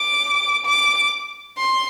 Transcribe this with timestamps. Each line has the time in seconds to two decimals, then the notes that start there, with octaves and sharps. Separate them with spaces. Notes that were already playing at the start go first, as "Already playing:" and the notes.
Already playing: D6
0.66 D6
1.58 C6